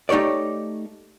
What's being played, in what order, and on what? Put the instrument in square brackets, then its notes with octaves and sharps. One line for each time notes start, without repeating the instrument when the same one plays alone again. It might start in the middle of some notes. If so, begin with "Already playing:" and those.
[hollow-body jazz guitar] A3 D#4 G4 C#5 D5